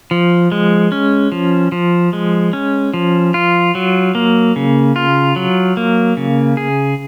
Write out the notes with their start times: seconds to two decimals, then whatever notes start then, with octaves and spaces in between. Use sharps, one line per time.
0.11 F3
0.52 G#3
0.92 C#4
1.32 F3
1.72 F3
2.13 G#3
2.53 C#4
2.94 F3
3.34 F4
3.75 F#3
4.15 A#3
4.56 C#3
4.96 F4
5.36 F#3
5.77 A#3
6.17 C#3
6.57 G#4